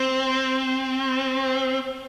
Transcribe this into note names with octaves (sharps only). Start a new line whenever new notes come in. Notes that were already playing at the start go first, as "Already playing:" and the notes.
Already playing: C4